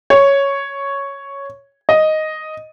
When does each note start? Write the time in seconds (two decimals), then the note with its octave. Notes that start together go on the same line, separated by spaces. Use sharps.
0.10 C#5
1.89 D#5